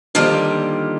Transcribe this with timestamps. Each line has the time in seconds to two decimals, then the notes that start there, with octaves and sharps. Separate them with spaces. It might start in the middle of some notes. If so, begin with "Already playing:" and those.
0.15 D3 D#3 F3 G3 A#3